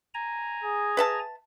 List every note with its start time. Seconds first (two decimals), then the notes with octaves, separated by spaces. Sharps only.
0.14 G#5 A#5
0.64 G#4
0.97 B4 E5 A5